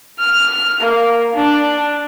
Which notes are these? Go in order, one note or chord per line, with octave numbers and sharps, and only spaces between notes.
F6
A#3
D4